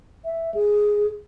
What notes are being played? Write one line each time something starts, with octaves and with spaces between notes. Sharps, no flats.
E5
G#4